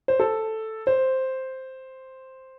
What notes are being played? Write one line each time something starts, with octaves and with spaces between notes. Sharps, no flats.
C5
A4
C5